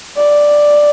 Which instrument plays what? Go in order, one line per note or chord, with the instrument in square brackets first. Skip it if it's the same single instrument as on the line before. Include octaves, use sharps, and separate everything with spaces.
[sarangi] D5